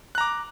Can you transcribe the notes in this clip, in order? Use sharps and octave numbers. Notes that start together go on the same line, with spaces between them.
A#5 D6 F#6